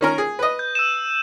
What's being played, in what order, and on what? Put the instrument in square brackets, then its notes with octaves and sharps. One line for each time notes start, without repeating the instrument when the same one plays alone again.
[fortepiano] D#3 C#4 A#4
G#4
B4 D#5
[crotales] G6
E6 D#7 E7